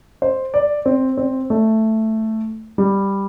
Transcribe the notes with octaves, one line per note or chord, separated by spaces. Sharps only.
C5
D5
C4
C4
A3
G3